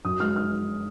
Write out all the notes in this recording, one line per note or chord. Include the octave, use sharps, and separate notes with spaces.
F#2 D#6
G#3 F6
F6